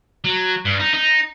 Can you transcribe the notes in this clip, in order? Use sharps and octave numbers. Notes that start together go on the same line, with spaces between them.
F#3
G2
D#4
D#4